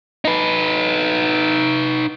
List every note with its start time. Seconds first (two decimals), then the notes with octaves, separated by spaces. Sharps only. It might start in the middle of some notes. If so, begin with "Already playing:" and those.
0.25 D#4 B4